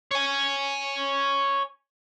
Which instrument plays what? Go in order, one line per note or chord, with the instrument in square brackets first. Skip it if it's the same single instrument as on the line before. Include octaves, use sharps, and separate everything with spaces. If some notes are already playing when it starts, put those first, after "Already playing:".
[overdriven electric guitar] C#5 G#5